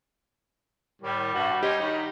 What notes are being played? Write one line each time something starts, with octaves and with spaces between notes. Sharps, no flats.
A2 D#3 G3
G2 B2 F#4
D4 G4 C5 C#5 D#5
D#3 C#5 A#5 B5